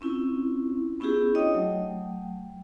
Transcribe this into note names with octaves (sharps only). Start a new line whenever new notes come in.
C4 C#4 E4 F4
B3 C#4 E4 F4 G4 G#4
D4 F#4 C#5 D#5 G5 D#6
F#3 A3 G5